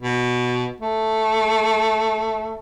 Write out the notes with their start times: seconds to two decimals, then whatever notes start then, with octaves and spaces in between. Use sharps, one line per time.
0.02 B2
0.80 A3